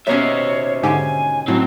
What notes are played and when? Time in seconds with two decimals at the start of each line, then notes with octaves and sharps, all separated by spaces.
0.07 D#2 B2 C#4 C5 C#5 E5
0.83 G#2 D3 G4 G#5
1.48 A2 F#3 C4 C#4